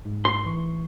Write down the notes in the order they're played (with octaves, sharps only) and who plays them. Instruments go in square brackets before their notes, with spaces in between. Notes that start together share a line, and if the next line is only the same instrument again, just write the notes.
[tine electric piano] G#2
[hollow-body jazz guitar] C6
[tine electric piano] A1 E3 C#6